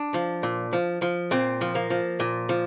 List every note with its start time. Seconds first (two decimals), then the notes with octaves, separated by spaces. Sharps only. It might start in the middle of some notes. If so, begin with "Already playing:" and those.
Already playing: D4
0.14 F3
0.43 A#2
0.73 F3
1.02 F3
1.31 A#2 C4
1.61 F3
1.75 A#3
1.90 F3
2.20 A#2
2.49 F3